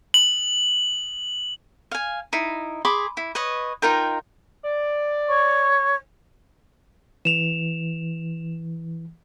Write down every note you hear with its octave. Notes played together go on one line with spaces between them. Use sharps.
F#7
F5 G#5
D#4 E4
G#4 B5 C6 D6
E4
B4 C#5 D#5
D#4 F4 A#4 G5
D5
C#5 C#6
E3 E7 F7